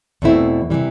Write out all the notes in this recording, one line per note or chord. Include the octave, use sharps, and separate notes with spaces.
E2 B2 A3 C4 E4
C3 E3 G3